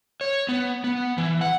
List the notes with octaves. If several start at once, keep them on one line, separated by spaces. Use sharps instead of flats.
C#5
B3
B3
E3
F#5